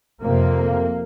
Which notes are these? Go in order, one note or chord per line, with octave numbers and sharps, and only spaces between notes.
F2 C3 A#3